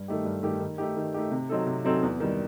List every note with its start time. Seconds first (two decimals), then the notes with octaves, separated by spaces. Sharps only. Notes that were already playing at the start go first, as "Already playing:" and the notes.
Already playing: G2
0.08 D#3 A3 D#4 G4
0.25 G2
0.43 D#3 A3 D#4 G4
0.60 D#3
0.78 A3 D#4 G4
0.96 D#3
1.14 A3 D#4 G4
1.31 C3
1.49 F#3 C4 D#4 A4
1.67 C3
1.85 F#3 C4 D#4 A4
2.03 E2
2.20 D#3 G3